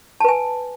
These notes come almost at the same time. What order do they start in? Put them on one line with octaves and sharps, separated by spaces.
A5 B4 G#5